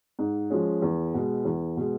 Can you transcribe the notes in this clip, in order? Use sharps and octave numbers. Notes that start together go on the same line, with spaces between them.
G#2
F3 G#3 C#4
E2
B2 G#3
E2
B2 G#3